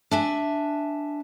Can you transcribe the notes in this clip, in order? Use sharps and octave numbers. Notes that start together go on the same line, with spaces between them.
D4 E5 G#5